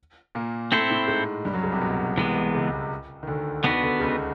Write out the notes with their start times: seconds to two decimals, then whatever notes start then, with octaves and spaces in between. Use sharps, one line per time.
0.35 A#2 A#3
0.72 A2 A3 C4 E4 A4 C5
0.90 A2 A3
1.08 G#2 G#3
1.45 G2 G3
1.54 F#2 F#3
1.63 C#2 C#3
1.72 C2 C3
1.82 B2
2.18 C2 C3 E3 G#3 B3
2.54 C#2 C#3
3.23 D#3
3.27 D2 D3
3.64 D#2 D#3 B3 D4 F#4 B4
3.82 D2 D3
4.00 C#2 C#3